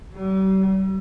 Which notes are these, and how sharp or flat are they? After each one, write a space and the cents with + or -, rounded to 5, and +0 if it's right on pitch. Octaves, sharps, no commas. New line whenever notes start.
G3 -40